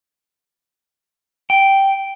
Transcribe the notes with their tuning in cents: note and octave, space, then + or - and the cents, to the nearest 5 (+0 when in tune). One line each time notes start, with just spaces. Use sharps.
G5 -5